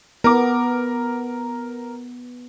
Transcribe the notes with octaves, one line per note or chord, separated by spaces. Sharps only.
B3 A#4 D6